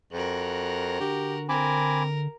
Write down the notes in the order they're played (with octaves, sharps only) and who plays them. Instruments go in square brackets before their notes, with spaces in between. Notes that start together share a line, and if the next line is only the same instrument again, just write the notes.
[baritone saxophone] F2 [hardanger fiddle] F#4 A#4
[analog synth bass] D3 [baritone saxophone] G4
[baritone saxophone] C4 [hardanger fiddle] A#4 [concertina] G#5 B5 D6